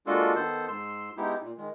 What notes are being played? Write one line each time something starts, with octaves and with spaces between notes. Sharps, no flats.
G#3 A#3 D4 F4 F#4 A4
D#3 B3 A4 C5
G#2 C6 E6
G#3 B3 D#4 E4 G4
A#2
D#3 G#3